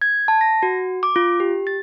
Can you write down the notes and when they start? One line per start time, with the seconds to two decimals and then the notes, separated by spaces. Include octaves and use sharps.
0.02 G#6
0.28 A5
0.41 A#6
0.63 F#4
1.03 D6
1.16 F4
1.40 G4
1.67 A6